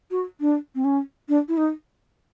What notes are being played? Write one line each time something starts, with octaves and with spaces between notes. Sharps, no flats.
F#4
D4
C4
C#4
D4
E4
D#4